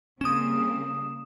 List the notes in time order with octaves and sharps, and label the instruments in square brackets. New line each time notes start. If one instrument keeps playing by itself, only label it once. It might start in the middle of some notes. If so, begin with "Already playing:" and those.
[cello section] C#3 G3 A#3 [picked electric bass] C4 C#4 [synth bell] D#6 E7